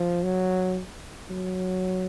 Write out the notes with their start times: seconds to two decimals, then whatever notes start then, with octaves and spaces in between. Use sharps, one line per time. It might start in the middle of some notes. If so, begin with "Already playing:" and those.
Already playing: F3
0.23 F#3
1.30 F#3